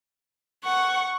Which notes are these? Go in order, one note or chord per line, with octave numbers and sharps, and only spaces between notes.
F#5 C#6